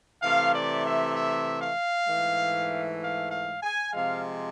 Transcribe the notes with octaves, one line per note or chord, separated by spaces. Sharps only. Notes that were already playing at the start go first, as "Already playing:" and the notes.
C3 E3 A3 F5
D5
E5
E5
F5
G#2 E3 A3
F5
F5
G#5
C3 F3 G#3 F5